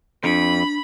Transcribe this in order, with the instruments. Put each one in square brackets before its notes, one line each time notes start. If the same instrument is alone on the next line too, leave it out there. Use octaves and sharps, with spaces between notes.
[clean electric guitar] F2 [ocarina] D4 [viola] B5